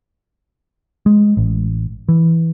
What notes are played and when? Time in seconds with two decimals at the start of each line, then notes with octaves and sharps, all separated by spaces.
1.06 G#3
1.37 A1
2.09 E3